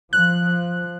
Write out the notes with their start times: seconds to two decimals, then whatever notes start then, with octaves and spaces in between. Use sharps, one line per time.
0.13 F3 F#6